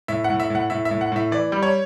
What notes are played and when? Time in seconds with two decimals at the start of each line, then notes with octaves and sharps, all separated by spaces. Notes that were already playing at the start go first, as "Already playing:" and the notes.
0.08 A2 E5
0.24 F#5
0.30 A2
0.40 E5
0.50 A2 F#5
0.70 A2 E5
0.85 E5
0.91 A2
1.01 F#5
1.12 A2 E5
1.31 E3 D5
1.52 G3
1.63 C#5